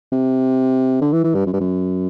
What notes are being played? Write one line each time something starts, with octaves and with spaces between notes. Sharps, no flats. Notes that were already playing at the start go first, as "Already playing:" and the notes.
C3
D3
E3
E3
G2
F#2
G2
F#2